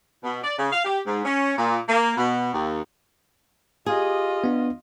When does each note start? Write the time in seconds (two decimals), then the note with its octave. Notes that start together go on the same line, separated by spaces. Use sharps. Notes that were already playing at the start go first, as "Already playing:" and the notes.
0.23 B2
0.44 D5
0.58 C#3
0.72 F5
0.85 G4
1.06 G#2
1.25 C#4
1.57 A#2
1.88 A#3
2.17 B2
2.53 D#2
3.86 F4 G4 G#4 D#5
4.44 B3 D4